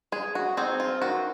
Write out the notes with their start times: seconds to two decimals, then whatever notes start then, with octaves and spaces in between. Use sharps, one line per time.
0.12 G#3 G#4
0.35 F#4
0.57 C4 D#4 G#4
0.80 F4
1.02 D#3 F#4